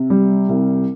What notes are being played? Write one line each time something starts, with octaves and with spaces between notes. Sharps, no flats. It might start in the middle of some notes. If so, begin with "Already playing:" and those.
Already playing: C3
G3
C2